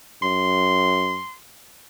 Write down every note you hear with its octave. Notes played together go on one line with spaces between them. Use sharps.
F#2 C6